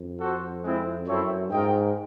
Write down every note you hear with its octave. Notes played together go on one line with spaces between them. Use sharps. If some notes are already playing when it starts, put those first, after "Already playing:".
Already playing: F2
F#4 A4 C5
G#3 C4 E4
F#2 C4 E4 A4 C#5 E5
G#2 F4 A#4 D#5 G5